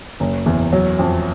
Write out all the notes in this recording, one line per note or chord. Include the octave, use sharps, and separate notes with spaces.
F#1
E2
F#3
F2